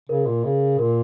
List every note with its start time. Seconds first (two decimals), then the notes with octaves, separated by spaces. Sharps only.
0.09 C#3 A#4
0.26 A#2
0.44 C#3
0.79 A#2 A#4